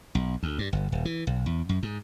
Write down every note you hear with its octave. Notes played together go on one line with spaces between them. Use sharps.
B1
D2
G2
G1
D#1
E3
B1
E2
F#2
G#2